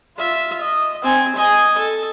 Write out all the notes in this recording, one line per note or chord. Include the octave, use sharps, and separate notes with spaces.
F4 E5
D#5
C4 G#5
D#5 G#5
A4